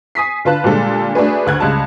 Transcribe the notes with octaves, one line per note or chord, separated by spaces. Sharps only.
G#5 D#6 B6 C7
D3 F4 B4 A5 F#6
A#2 D3 G3 G#3 A4
A3 D4 F#4 G#4 B4
D2 F#6 G#6
C#2 G3 A5